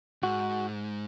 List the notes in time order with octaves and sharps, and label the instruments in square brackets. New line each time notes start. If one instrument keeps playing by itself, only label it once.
[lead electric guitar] G#2 [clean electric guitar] F#4